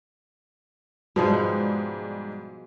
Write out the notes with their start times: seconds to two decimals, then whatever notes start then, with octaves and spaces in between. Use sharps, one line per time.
1.16 G#2 B2 F3 G3 G#3